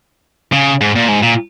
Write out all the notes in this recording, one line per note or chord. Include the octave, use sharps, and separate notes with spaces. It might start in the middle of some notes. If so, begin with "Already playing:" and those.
C#3
G#2
A#2
G#2
A#2